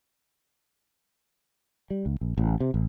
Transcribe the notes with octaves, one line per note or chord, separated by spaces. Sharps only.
G3
C#2
A#1
A1
C3
A1